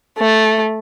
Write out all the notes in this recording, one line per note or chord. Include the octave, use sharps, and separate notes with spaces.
A3